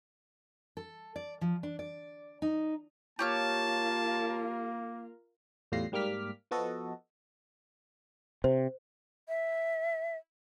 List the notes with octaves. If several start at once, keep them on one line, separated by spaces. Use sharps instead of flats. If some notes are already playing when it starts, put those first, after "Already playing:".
A4
D5
F3
D4
D5
D#4
A#3 F4 G4 A#4 C#5 A5 F6
E2 A2 G3 F4 A#6 C7
G#2 G3 A#3 D6 F6 B6
F3 B3 F#4 A4 D#5
C3 C5
E5